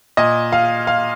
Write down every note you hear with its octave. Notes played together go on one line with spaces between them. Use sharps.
A#2 D#5
F5
F5